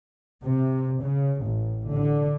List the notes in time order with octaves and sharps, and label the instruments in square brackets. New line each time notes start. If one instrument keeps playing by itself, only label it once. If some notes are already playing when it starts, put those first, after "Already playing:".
[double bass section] C3
C#3
A1
D3